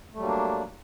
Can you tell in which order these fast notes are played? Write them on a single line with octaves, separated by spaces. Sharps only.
A3 G3 F#3 A#3 D4